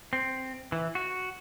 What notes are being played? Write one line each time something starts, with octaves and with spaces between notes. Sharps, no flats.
C4
E3
F#4